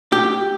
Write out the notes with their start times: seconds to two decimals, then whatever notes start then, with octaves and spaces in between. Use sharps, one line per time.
0.12 G4